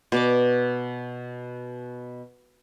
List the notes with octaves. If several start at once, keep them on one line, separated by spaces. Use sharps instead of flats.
B2 D5 D6